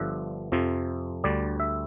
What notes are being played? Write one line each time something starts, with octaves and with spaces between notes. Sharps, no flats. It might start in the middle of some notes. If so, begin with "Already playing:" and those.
Already playing: G1 G2 D3 F3 E5
F2 C3 F3
D2 D3 G3 D5
E5